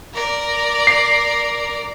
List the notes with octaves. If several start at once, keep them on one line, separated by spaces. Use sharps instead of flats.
A#4 D5
C7